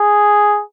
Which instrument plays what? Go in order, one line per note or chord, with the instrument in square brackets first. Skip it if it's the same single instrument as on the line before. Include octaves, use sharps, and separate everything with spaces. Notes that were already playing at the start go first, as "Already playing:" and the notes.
Already playing: [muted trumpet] G#4